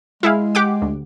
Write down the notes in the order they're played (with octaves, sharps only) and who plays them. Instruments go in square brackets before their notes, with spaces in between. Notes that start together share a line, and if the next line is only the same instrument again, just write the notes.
[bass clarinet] G#3 [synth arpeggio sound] E4 G#4 F5
[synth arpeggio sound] G4 F#5 D6
D2